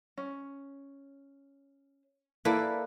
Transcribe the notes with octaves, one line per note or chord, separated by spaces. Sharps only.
C#4
A#3 E4 A4 B4 D5